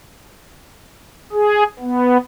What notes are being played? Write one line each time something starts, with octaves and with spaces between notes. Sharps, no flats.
G#4
B3